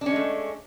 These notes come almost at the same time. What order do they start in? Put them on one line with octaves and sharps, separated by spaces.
D4 C#4 G#3 A3